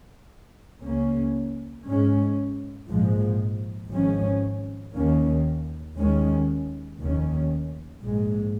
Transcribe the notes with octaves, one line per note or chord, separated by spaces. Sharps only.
C#2 C#3 A#3 C#4
G#2 G#3 C#4
A#1 G#2 F3 G#3
G#1 G#2 F3 C#4
D#2 D#3 A#3 C#4
D#2 D#3 G#3 C#4
F1 D#2 D#3 C#4
A#1 G#2 G#3